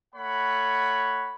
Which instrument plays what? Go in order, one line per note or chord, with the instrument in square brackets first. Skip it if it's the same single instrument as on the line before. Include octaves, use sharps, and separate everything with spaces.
[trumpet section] A3 C#5 F#5 B5